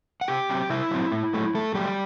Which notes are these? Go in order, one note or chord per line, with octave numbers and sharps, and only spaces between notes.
F#5
C3 G4 G5
F#3 C4
C3 E4 E5
F#3 C4
A2
F#3 A3
A2 A3 A4
F#3 G3 A3 G4